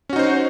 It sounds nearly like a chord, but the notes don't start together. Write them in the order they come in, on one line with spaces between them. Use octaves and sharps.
C#4 F#4 D#4 C5